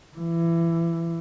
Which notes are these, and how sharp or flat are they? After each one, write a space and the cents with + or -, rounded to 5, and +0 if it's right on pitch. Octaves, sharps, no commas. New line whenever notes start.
E3 +25